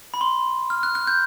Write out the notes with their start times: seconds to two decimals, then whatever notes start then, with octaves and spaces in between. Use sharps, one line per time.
0.14 B5
0.21 C6
0.70 F6
0.83 F#6
0.95 F#6
1.07 G6